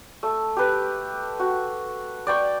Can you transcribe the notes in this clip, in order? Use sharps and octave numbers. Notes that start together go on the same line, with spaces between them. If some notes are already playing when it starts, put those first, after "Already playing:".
A3
G4 B4
F#4
D5 G5 C#6